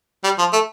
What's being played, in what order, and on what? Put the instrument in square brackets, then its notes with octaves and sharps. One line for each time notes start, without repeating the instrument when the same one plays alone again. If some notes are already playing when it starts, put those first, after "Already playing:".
[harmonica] G3
F3
A3